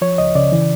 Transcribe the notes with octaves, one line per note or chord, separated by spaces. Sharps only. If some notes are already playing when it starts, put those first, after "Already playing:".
F3 C#5
C#2 D#5
C#3 D5
E3